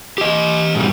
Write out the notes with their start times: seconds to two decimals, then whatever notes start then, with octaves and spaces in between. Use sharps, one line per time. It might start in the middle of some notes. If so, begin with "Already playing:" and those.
0.18 G4 D#5
0.75 G#2 B2 G3